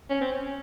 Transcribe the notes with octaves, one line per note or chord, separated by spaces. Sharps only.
C#4
C4
C#4